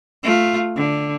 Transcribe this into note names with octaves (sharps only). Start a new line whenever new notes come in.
A3 F4
D3